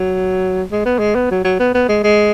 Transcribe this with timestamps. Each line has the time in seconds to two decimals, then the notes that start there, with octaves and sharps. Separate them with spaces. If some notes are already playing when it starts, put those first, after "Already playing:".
Already playing: F#3
0.72 G#3
0.85 B3
0.99 G#3
1.15 B3
1.31 F#3
1.45 F#3
1.60 B3
1.74 B3
1.89 G#3
2.04 G#3